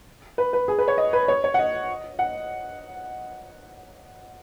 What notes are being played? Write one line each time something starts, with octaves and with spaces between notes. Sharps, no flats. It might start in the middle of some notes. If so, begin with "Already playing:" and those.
B4
B4
G#4
B4
C#5
D#5
B4
C#5
C#5
F#5
D#5
F#5